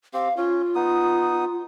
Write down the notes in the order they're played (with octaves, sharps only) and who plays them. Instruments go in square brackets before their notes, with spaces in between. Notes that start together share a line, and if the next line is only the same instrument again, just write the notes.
[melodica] C4 G4 [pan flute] F5
[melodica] C#4 [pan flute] F4
[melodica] B3 D#4 D#6